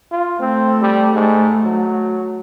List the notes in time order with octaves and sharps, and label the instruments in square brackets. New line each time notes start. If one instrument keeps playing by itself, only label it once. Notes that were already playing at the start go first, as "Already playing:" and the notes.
[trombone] F4
[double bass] A3 [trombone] C4
[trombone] G3
G#2
F#3